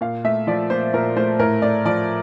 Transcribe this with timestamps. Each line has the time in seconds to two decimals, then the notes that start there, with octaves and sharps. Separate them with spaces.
0.01 A#2 F5
0.24 A3 E5
0.47 F3 D5
0.70 A#2 C5
0.94 A#2 A#4
1.16 A3 C5
1.39 A2 A#4
1.62 A3 D5
1.85 F3 D5